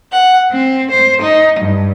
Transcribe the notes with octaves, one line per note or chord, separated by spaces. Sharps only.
F#5
C4
C5
D#4
G2